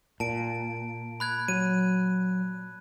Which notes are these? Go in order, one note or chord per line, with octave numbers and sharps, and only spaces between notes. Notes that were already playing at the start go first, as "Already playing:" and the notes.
A#2 A5 D7
B5 F#6 G#6
F#3 D#7